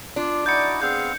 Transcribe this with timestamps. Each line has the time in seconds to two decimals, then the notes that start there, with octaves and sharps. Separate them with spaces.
0.16 D4 F4
0.46 D#4 E4 F#4 D5 G6 C#7
0.82 B3 C4 G#4 F5 G6